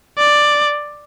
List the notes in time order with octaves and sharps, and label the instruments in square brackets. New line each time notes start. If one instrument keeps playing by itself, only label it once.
[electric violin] D5